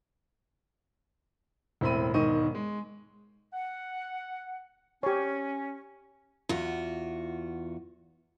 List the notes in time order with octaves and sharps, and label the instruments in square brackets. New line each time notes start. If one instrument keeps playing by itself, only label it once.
[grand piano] E1 A2 C4 E5 B5 D#7
E1 G#2 D#3 D#5 C#6 D#7
G#3
[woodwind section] F#5
[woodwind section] C#4 [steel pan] G4 C#5
[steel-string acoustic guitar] E2 F4 F#4